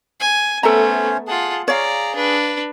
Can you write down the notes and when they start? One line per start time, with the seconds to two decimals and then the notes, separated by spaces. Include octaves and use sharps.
0.20 G#5
0.63 A3 B3 C#4 A4 C5 C#5 E5 A#5
1.28 F4 G#4 F#5 A5
1.68 G#4 C#5 D5 F5 A#5
2.15 D4 B4